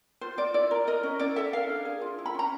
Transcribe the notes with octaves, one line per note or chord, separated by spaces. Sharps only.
F4 C5
F4 D5
E4 D5
A#4
A#4 D#5
C#4
E4 D5
A4 E5
A#4 F5
D4
G#4
F4
E4
B5
C#4 A#5